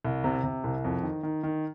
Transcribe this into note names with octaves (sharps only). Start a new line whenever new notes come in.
C2
C3
C3
C2
F2
D#3
D#3
D#3